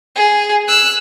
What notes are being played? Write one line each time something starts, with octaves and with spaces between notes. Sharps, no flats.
G#4
E6 F#6